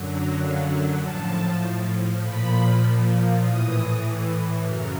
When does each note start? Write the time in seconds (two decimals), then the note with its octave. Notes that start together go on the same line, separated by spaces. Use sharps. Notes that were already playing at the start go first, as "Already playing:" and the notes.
Already playing: F#2 D3 F#3
0.10 A#5
0.40 F5
0.70 E5
1.00 A2 F3 A5
2.21 A#2 F3 B5
3.42 A2 E3 D#6
4.63 F#2 C#3 F#3 F6